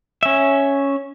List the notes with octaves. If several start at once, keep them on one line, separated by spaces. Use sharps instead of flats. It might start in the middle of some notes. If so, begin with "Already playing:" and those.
C#4 E5